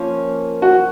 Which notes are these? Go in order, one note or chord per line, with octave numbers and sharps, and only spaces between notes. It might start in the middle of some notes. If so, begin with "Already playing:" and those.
Already playing: F3 A#3 C#4
F#4